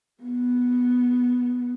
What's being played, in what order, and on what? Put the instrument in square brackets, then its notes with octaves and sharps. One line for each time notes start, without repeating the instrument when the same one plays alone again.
[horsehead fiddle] B3